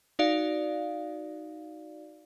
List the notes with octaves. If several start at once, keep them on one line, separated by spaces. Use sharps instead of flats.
D#4 F#4 D5 F5